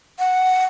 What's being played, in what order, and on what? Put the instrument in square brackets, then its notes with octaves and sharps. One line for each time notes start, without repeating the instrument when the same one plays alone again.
[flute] F#5